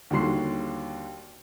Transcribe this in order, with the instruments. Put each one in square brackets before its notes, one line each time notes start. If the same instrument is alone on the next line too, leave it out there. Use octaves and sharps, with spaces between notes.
[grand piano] D#2 D3 G3 F#4 C6 C7